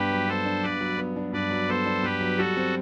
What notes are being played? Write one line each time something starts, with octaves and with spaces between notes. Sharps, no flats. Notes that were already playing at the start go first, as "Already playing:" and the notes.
Already playing: G2 B3 D4 G4 B4
F#3
B3 A4 C5
D4
G2 B4 D5
F#3
B3
D4
G2 B4 D5
F#3
B3 A4 C5
D4
G2 G4 B4
F#3
G3 F#4 A4
C4